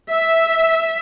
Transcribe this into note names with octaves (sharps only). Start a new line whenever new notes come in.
E5